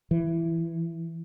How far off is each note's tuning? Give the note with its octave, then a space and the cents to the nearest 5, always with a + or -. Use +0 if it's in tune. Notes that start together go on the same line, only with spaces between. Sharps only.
E3 +10